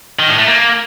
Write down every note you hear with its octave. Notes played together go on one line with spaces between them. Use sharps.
D#3
A2
A3
A#3